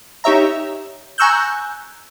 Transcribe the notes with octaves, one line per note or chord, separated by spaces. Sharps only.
D#4 G4 C#5 E5 A#5
G#5 A#5 C#6 E6 F#6 G6